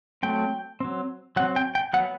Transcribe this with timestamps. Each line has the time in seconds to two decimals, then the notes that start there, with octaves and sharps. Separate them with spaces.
0.23 F#3 A3 C4 G5
0.80 F#3 C4
1.36 F#3 C4 F#5
1.56 G5
1.75 G5
1.93 F#3 B3 F#5